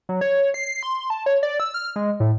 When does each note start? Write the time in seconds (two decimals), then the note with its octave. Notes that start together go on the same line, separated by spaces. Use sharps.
0.09 F#3
0.21 C#5
0.54 C7
0.83 C6
1.10 A5
1.26 C#5
1.43 D5
1.60 E6
1.74 F6
1.96 G#3
2.20 A2